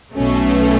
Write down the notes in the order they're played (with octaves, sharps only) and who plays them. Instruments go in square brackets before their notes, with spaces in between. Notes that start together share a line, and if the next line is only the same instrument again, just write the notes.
[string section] B1 B2 A3 C#4